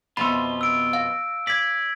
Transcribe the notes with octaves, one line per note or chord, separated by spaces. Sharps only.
F2 B2 B3 F4 B5
E6 D7
F5
D5 G#6 B6